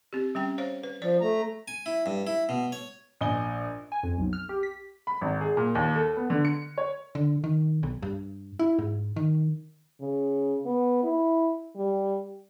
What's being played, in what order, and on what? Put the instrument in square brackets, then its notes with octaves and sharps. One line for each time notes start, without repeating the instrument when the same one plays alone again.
[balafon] C4 G4
G3 C#4 G5
C5 C#5 F5
B4
[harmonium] F3 [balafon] C5 D5
[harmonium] A3 A#5
[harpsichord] G#5
E4
G2
E4
B2
C#5
[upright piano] A#1 D#5 G#5 G7
[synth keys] G#5
F2
B1
F6
G4
B6
[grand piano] B5
G#1
G#4
A#2
D#2
A4
B3
D3
C#7
C#5
[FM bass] D3
D#3
B1
G2
E4
G#2
D#3
[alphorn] C#3
B3
E4
G3